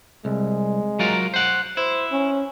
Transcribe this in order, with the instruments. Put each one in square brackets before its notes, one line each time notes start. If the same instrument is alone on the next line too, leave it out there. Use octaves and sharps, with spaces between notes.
[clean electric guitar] C2 [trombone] G#3
[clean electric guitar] F#3 F4 A#4
C5 F#5
[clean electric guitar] E4 [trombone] C5
[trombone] C#4